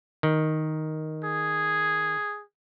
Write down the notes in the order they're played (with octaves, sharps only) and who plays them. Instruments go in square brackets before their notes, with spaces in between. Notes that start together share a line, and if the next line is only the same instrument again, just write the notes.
[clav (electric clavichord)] D#3
[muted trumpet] G#4